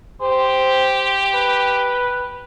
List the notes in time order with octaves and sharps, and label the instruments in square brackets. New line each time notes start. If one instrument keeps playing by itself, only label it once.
[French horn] G4 [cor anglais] C5
[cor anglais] B4